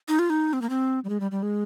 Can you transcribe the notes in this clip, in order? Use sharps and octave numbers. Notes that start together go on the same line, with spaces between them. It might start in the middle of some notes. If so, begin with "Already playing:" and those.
D#4
F4
D#4
C4
A#3
C4
G3
G#3
G3
G3
G#3